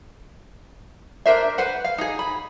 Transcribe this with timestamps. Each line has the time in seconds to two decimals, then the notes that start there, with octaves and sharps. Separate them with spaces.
1.26 D4 A#4 C5 E5
1.58 B4 C5 F#5
1.84 F5
1.98 D#4 G#4
2.19 B5